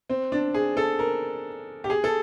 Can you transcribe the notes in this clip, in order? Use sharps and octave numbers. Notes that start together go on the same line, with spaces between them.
C4
D4
G#4
A4
A#4
G4
G#4
A4